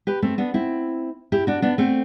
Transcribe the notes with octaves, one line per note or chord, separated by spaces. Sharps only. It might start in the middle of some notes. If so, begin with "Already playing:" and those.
G4 B4
A3 C4
B3 D4
C4 E4
E4 G4
D4 F#4
B3 D4
A3 C4